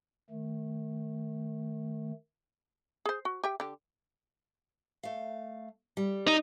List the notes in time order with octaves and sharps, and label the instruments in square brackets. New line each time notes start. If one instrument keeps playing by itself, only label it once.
[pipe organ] D#3 A3
[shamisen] G#4 C5
F#4
G4 E5 G5
D3 G4
[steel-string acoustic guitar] A3 F5
G3
[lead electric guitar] D#4